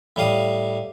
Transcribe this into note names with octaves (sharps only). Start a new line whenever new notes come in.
A2 G3 F5 D#6